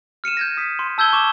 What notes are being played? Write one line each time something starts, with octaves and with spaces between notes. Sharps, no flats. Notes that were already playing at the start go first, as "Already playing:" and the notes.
F6 C#7 D#7 E7
G6 G#6 A#6
D#6 B6
C6
A5 E6 G6 G#6 G7
C#6 D6 E7